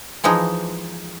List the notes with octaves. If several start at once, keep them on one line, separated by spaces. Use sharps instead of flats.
E3 F3 G#3 D#4